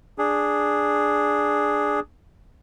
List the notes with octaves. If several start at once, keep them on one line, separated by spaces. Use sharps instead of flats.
D4 G#4